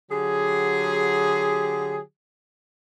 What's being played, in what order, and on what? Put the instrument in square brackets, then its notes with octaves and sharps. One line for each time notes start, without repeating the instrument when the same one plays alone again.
[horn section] D3 F#3 G4 G#4